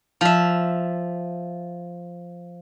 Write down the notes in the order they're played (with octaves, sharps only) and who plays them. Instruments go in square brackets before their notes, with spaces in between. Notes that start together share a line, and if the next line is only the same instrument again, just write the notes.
[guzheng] F3 E5